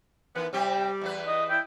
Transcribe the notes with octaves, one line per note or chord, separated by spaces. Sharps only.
D#3 E3 B3 B4
C3 G3 C4 G4
E2 E3 B4
D#5
E4 G5